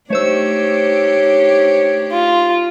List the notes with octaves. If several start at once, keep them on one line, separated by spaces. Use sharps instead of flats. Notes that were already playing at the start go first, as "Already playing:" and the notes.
A3 D4 D#4 G4 C5 C#5 E6
F4